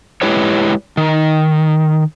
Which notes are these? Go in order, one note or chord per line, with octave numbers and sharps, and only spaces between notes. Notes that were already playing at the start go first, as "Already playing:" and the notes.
G#3 E4 G4 B4 C#5
D#3